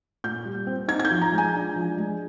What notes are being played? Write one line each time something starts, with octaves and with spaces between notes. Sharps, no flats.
A#2 G6
G3
C4
D#4 G#6
G#6
G6
F3
A#5
G#3
G#5
D4
F3
G#3